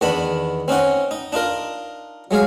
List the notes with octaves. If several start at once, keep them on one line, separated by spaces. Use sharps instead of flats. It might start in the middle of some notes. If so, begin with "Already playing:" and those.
E2 D#3 B3 D4 B5
C4 C#4 D#4 F#5
D#4
D4 D#4 F4 A#4
F#3 G#3 G#4 F5